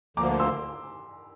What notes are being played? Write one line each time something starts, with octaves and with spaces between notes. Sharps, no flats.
D2 D3 F3 A#3 A#5 D6
C6 E6